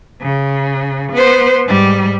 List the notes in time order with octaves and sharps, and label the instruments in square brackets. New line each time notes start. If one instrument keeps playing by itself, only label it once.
[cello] C#3
B3 C5
G#2 G3